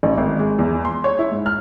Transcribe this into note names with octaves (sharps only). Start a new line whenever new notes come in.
A1
G#1
G#3
E2
C6
C#5
E4
G#2
F6